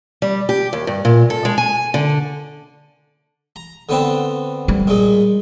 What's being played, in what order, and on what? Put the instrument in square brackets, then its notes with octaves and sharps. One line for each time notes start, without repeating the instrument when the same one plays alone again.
[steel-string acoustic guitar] G3
G4
D#2
G2
A#2
A4
G#3
G#5
D3
[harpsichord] A#5
D3 B3 C4
[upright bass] G3
[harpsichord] A#2 G#3